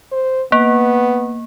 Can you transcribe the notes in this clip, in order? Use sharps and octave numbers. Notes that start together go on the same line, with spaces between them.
C5
A#3 B3